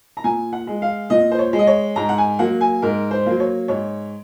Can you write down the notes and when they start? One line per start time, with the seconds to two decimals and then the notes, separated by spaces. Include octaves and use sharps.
0.17 A#5
0.24 A#2 G#5
0.53 F#5
0.67 G#3
0.82 F5
1.10 A#2 D#5
1.31 C5
1.39 C#5
1.53 G#3
1.59 D#5
1.67 C#5
1.96 G#2 A#5
2.09 F#5
2.18 G#5
2.39 F#3 A#3 F#5
2.61 G#5
2.82 G#2 A#4
3.11 C5
3.26 F#3 A#3
3.40 C#5
3.68 G#2 C#5